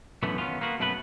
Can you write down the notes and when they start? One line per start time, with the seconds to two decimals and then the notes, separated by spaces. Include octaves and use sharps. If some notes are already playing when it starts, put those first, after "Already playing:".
0.23 F#2 B2 D3 E3 A3 B3
0.38 D#3 B3 C#4 F4
0.61 A#3 B3 F#4
0.79 F#2 B2 A3 B3 B4